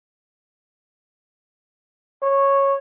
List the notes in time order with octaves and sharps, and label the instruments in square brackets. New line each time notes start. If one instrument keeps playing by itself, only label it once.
[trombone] C#5